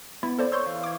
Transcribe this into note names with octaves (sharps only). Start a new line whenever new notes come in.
B3 E4
A4 C5 D5
C#5 C6 C#6 E6 G6
E3 F5
D6 G#6